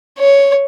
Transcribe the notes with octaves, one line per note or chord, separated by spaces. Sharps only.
C#5